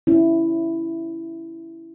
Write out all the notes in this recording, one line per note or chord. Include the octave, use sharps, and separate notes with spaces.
C#4 E4